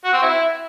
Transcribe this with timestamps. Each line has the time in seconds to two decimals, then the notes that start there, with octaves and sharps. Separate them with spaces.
0.04 F#4
0.13 C4
0.22 E4